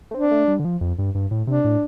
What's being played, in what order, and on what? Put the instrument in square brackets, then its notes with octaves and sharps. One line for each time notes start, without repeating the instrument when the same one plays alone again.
[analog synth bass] A3
[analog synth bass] C4 [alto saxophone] D4
[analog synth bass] A3
G3
D3
F3
F2
G2
G2
A2
[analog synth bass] C3 [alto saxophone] D4
[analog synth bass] A2